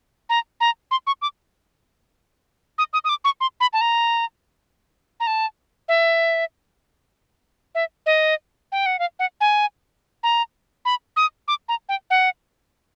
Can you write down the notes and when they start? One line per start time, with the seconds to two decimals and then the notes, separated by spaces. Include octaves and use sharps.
0.30 A#5
0.61 A#5
0.91 C6
1.07 C#6
1.22 D6
2.78 D#6
2.93 D#6
3.05 D#6
3.09 D6
3.25 C#6
3.41 C6
3.60 B5
3.73 A5
3.81 A#5
5.20 A#5
5.27 A5
5.88 E5
7.75 E5
8.06 D#5
8.72 G5
8.86 F#5
8.99 F5
9.19 F#5
9.41 G#5
10.23 A#5
10.85 B5
11.16 D#6
11.48 D6
11.69 A#5
11.89 G5
12.10 F#5